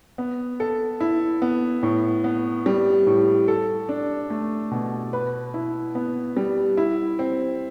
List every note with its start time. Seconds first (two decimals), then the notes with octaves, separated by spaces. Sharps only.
0.18 B3
0.60 A4
1.00 E4
1.42 B3
1.83 A2
2.24 B3
2.66 G3
3.07 A2
3.48 A4
3.89 D4
4.30 A3
4.71 B2
5.13 B4
5.54 E4
5.95 B3
6.37 G3
6.77 E4
7.19 C4